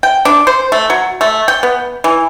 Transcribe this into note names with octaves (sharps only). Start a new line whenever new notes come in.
G5
D4
C5
A3
F#3
A3
G5
B3
E3